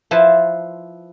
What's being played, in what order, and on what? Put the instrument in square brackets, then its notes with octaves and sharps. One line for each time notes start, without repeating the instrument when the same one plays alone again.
[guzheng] F3 E4 B4 C5 A5